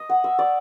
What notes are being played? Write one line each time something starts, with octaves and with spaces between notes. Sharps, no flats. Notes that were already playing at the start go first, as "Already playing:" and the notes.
Already playing: D#5
F#5
E5
D5